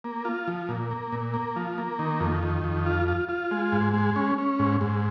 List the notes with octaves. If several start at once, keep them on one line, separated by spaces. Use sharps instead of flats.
A#3
F4
F3
A#2
A#3
A#2
A#3
F3
A#3
D#3
F2
D#3
F2
F4
F4
F4
G#3
G#2
G#3
C#4
C#4
G#2
G#2